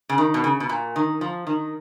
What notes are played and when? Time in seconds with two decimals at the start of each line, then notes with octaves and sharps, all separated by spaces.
0.09 C#3
0.18 D#3
0.34 B2
0.44 C#3
0.60 B2
0.69 A#2
0.96 D#3
1.21 F3
1.47 D#3